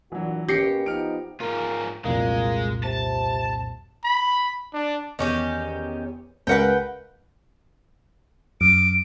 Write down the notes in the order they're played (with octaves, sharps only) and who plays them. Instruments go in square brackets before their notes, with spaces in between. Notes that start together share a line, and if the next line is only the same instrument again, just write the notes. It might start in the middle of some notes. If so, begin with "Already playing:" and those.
[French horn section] A#2 D4 F#4 [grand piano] E3 F#3
[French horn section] B2 A#3 C#4 [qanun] G4 [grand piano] A#6 C7 C#7
[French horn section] F3 B3 D#4 [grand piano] F6 D7
[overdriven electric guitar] G#2 F4 [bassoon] A#4
[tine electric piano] C2 F2 A#2 [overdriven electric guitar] G#3 [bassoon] A#3
[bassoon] C3 [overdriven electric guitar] A5
[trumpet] B5
D4
[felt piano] E2 [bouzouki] D#3 C#4 G4
[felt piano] C#2 A#4 [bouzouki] B4 F#5 G5
[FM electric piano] F#2 [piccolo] D7